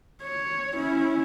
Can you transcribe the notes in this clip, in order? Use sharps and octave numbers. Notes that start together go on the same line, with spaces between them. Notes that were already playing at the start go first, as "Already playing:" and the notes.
C#5
C#4 E4